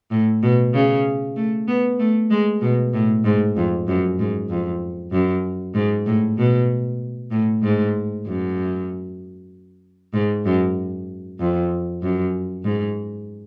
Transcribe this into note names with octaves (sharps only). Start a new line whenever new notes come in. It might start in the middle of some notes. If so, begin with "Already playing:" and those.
A2
B2
C#3
A3
B3
A3
G#3
B2
A2
G#2
F2
F#2
G#2
F2
F#2
G#2
A2
B2
A2
G#2
F#2
G#2
F#2
F2
F#2
G#2